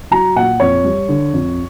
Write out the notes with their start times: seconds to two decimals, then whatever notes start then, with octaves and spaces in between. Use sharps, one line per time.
0.11 F#3 A#5
0.36 A#2 F#5
0.60 F2 C#5
0.84 G3
1.09 D3
1.33 F2